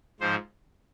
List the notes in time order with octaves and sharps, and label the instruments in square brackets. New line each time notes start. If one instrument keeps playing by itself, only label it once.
[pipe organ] G#2 F3 C5